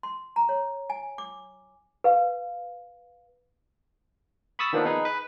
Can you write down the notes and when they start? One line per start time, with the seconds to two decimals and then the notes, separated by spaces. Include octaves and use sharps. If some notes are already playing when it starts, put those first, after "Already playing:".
0.03 C6
0.36 A#5
0.49 C#5
0.90 G#5
1.18 D6
2.04 B4 F5
4.59 B5 C#6 D#6 E6 A6 B6
4.73 D#3 F3 A#3 B3 D4
4.85 D#4 G#4 B4
5.05 B4